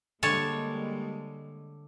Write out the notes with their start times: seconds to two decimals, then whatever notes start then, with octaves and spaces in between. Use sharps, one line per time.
0.23 D3 G3 G#3 A#3 C#5 A5